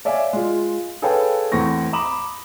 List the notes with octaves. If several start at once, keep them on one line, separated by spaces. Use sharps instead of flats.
C#5 D5 E5 F5 G#5
G#3 F4
G#4 A4 B4 C#5 F5 G5
E2 A2 C4 C#6 A#6
A#5 B5 D6 D#6 E7 F#7